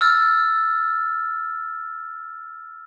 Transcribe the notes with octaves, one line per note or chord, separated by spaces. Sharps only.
E6 F6 A6